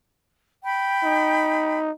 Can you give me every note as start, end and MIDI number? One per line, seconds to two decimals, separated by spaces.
0.64 1.79 79
0.64 1.79 83
1.04 1.91 63